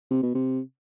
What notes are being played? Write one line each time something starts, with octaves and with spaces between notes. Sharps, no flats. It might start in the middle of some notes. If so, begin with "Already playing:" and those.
C3
B2
C3